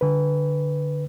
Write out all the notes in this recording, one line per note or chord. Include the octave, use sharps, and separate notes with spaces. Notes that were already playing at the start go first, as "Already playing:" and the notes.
D3 B4